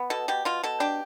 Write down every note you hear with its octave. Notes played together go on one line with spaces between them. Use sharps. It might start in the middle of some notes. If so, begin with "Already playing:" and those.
Already playing: B3
B2 A4
B2 G4
B2 F4
B2 A4
D4 G4